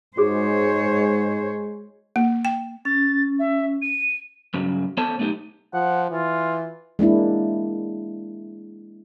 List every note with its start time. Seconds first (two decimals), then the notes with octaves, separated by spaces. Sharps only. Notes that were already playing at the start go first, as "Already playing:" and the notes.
0.17 G#2 G#3 F#4 G#4 C5 C#5
2.16 A#3
2.45 G5
2.85 C#4 A6
3.39 E5
3.82 D#7
4.54 G2 C#3 F#3
4.97 B3 A4 C5 C#5 A5
5.18 B1 A3 D#4 G4
5.74 F3 F#5
6.11 E3 F4
6.99 G#3 A#3 D4 E4